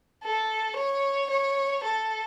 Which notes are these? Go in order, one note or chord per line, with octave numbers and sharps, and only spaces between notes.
A4
C#5
C#5
A4